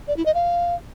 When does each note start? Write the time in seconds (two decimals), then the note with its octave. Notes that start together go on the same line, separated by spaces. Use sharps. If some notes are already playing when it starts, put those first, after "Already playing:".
0.08 D5
0.17 E4
0.26 D#5
0.35 F5